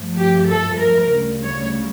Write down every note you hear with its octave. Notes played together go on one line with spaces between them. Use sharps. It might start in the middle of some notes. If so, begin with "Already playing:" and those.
Already playing: G2 F3 A3
G4
A4
A#4
D2 C#3 G3
C#5